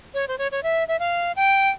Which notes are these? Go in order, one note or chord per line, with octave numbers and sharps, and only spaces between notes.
C#5
C5
C#5
C#5
E5
E5
F5
G5